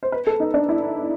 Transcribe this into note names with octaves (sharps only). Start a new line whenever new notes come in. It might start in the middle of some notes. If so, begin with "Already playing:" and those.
C5
B4
A4
D#4
D4
E4